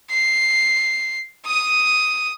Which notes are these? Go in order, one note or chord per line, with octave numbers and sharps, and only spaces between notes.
C7
D#6 D#7